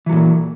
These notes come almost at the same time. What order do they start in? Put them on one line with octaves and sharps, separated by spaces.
E3 F#3 A#2